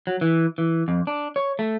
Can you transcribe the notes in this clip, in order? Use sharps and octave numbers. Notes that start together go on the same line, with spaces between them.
F#3
E3
E3
F2
D4
C#5
A3